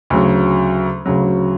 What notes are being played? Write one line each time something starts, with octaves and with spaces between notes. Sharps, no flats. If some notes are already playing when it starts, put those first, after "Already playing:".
D2 C#3 F#3
D2 C#3 F#3